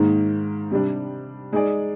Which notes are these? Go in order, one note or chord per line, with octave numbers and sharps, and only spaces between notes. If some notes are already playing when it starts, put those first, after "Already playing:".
Already playing: G#2 D#3 A#3
C3 G3 D4
G#3 D#4 G#4 D5